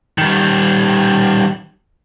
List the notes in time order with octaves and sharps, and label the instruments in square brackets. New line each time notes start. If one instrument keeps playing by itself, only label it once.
[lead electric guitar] D#3 G3